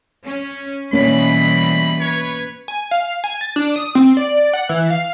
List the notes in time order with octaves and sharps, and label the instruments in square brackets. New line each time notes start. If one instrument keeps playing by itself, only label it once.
[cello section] C#4
[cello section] B2 E3 G3 [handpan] A#3 C#4 [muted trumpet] B5
[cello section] B4 [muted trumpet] C#5
[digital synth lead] G#5
F5
G#5
A6
D4
D#6
C4
D5
F#5
E3
F5